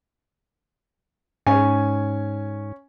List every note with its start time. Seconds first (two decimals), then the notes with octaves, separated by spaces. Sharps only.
1.47 G#2 C#4 G#5